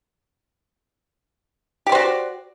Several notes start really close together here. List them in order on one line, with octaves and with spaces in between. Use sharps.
G4 D5 C5 F#4